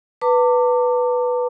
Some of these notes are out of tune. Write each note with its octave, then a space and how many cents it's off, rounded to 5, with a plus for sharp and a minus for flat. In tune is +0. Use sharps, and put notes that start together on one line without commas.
B4 +0 A5 +45 D6 +0